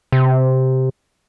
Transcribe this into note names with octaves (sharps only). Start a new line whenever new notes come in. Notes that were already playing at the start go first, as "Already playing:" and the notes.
C3